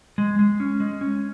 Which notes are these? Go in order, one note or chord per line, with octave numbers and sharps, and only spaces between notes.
G#3
G#3
C#4
G#3
C#4